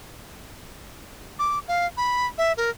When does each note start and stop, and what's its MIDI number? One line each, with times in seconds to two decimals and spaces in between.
1.39 1.59 86
1.68 1.86 77
1.97 2.27 83
2.38 2.52 76
2.57 2.70 70